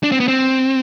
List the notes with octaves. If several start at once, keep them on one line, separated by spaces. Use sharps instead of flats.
D4
C4
B3
C4